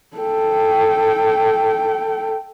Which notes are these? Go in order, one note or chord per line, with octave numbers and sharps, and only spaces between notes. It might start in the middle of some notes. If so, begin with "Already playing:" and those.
A4 G5